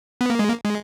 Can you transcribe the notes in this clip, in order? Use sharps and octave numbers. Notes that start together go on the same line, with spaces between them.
B3
A#3
G#3
A#3
G#3